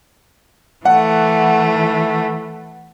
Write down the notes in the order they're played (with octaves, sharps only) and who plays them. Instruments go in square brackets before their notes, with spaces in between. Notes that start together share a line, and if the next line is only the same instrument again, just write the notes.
[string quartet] E3 A3 [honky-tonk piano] F#5